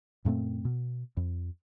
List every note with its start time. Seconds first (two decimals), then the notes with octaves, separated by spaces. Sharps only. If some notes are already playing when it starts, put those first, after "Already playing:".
0.25 F#2 A#2 A3 C4
0.65 B2
1.17 F2